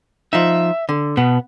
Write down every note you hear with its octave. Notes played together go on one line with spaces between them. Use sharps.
F3 D#4 E5
D3
B2 B3